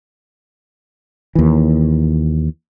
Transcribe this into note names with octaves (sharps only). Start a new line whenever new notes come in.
D#2 E3